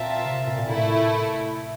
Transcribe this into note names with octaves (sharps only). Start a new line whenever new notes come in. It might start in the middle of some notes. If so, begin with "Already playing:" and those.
Already playing: A#2 C4 F4 A#4 E5 A5
C3
A#2
A#2
A2 A3 E4